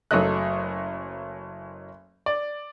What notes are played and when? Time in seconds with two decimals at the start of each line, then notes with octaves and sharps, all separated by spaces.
0.11 F#1 F#3 A3 D#5 F#6
2.26 D5